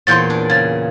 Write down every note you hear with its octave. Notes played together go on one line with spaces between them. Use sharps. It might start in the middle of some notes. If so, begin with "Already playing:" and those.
E2 A#2 C#5 C6 G6 A6
D4
C#3 G#6 A6